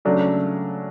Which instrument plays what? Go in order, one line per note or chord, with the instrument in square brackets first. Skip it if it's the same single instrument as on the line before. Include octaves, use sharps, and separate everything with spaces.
[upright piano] C#3 F#3 A3 D4